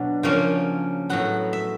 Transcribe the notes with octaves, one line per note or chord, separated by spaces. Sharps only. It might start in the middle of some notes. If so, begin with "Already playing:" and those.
Already playing: B2 F#3 B3 D4
C#3 F3 A#3 C#4
A2 F#3 B3 F#5
E5